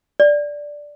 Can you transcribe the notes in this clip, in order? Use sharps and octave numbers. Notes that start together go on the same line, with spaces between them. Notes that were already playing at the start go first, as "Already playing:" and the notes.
D5